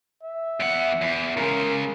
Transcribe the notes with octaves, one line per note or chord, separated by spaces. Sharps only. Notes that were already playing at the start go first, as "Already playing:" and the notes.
E5
E2 F#5
E2
C#3 G#3 A#4